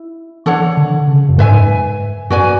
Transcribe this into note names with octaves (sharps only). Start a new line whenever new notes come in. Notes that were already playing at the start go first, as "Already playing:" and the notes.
Already playing: E4
E3 D4 A4 C#5 F#5
D3
C#3
F#2
G#2 B4 E5 G#5
F#2 F#4 B4 D5 G#5